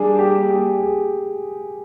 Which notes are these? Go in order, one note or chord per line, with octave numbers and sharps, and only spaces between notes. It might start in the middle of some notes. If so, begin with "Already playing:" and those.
Already playing: G3 A#3 D4 G#4
G4
G4
G#4